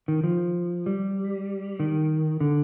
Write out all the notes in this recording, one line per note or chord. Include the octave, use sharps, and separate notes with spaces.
D#3
F3
G3
D#3
D3